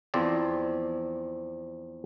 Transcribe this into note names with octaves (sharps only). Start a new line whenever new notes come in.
E2 F3 C4 D5